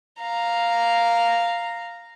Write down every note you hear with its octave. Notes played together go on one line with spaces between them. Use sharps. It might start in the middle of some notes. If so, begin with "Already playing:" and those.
F5 A#5